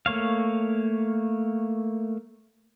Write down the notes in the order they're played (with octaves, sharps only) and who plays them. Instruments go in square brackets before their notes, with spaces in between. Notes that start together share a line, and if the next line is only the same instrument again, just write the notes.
[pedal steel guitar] A3 A#3 C#5 F5